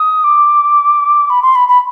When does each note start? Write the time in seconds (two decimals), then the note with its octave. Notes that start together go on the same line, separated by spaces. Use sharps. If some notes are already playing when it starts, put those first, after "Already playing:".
Already playing: D#6
0.24 D6
1.30 B5
1.42 C6
1.55 B5
1.68 B5